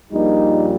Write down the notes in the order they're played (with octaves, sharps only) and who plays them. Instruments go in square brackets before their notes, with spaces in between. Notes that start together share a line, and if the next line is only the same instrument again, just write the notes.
[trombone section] A#1 A#2 G3 D#4